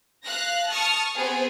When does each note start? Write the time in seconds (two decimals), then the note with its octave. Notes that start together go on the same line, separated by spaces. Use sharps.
0.24 F5 F#6 A#6
0.69 A5 C#6 D#6 F6
1.18 B3 C4 G#4 C5